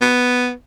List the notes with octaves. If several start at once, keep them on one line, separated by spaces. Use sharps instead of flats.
B3